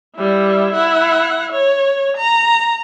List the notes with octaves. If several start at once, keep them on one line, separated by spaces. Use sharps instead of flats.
G3 E4
E4 F#5
C#5
A#5